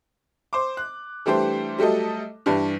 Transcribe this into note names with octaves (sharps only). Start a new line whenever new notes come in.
C5 D6
F#6
E3 G3 A3 D4 G4 C5
F#3 G3 A3 A4 D#5
G2 E3 G3 D4